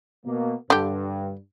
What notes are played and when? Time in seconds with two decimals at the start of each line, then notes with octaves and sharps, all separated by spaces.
0.25 B2 A#3
0.70 G2 D3 G4